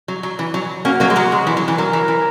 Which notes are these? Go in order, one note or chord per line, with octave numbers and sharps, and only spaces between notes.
F#3
F#3
E3
F#3
A#3 C#4 F#4
F#3 A#3
G#3
F#3 A#3
G#3
E3
F#3
E3
F#3 A#4
E3
E3